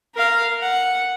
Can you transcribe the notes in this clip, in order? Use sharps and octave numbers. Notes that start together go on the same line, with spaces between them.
A#4 F5
F#5